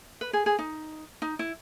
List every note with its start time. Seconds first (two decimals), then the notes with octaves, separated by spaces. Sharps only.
0.21 B4
0.33 G#4
0.46 G#4
0.59 D#4
1.22 D#4
1.39 E4